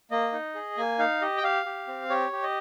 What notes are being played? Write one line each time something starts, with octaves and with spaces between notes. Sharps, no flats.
A#3 D#5
D#4
G#4
A#3 G#5
D#4 F5
G4 D#5
G5
G4 F5
G4
C4
G4 C#5
G4
D#5